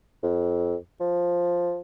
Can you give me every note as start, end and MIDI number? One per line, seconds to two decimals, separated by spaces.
0.23 0.75 41
1.01 1.80 53